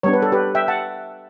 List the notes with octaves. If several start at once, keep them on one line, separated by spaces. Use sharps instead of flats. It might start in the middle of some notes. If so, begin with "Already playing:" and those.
G3 B3 D4 C#5
B4
A4
G4 B4
E5 G5
F#5 A5